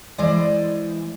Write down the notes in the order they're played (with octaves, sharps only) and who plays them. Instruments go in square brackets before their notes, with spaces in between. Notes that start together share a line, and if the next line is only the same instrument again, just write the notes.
[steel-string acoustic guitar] E3 G#3 C5 D5 D#5